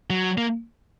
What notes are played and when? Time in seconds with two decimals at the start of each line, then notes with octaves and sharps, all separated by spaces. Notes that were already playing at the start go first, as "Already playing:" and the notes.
0.10 F#3
0.38 A#3